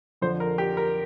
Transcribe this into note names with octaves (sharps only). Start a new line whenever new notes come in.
F2 D3 F3 C5
A#4
G4
A#4